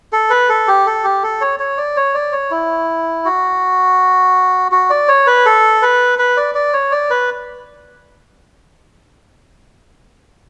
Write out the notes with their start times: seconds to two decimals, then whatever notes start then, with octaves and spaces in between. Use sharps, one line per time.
0.13 A4
0.30 B4
0.49 A4
0.68 G4
0.86 A4
1.04 G4
1.23 A4
1.41 C#5
1.60 C#5
1.78 D5
1.97 C#5
2.15 D5
2.32 C#5
2.51 E4
3.25 F#4
4.72 F#4
4.90 D5
5.08 C#5
5.27 B4
5.46 A4
5.82 B4
6.19 B4
6.37 D5
6.55 D5
6.73 C#5
6.92 D5
7.10 B4